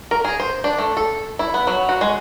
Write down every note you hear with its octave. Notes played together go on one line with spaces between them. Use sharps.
A#4
G#4
C5
D4
A3
A4
E4
B3
F#3
F#4
G#3